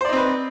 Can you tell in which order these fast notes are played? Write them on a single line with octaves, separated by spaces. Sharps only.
C5 D5 D#4 C4 B4